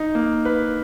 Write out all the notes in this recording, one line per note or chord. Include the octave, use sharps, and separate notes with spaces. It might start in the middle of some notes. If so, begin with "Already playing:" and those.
Already playing: D#4
A#3
B4